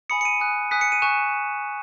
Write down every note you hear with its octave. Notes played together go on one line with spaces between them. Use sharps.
G#5 B5 D#6 C#7
C#7
D#7
G#5 D#6 F#6
G#5 D#6 F#6 B6
C#7
D#7
G#5 C#6 F#6 E7